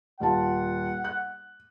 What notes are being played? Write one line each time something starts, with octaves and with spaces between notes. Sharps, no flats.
D#1 F4 F#5 A5
F#6